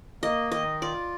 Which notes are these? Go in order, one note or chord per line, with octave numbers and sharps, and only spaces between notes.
A#3 D#5
D#3 D#5
F4 D5